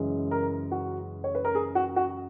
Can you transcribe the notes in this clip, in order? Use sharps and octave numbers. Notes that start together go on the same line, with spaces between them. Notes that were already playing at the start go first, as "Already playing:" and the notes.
Already playing: F#2 C#3 E3 G#3 C#4
A#4
F#4
C#5
B4
A#4
G#4
F#4
F#4